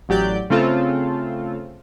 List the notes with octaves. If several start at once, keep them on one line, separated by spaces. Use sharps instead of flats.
A1 F#3 G4 D5 G6
C#3 A3 C4 F4 A4